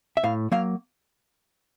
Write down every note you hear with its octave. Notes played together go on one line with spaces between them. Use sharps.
E5
A2 F5
F#3 A#3 F5